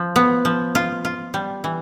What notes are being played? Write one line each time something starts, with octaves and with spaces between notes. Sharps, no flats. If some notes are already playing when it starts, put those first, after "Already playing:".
Already playing: F3
B3
F3
F4
F4
G3
E3